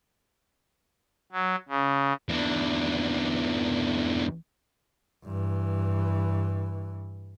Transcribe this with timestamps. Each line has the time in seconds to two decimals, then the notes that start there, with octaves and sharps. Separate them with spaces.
1.32 F#3
1.69 C#3
2.29 E2 D3
5.25 G2 E3